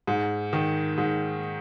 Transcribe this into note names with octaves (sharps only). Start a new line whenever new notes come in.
G#2
D#3
G#2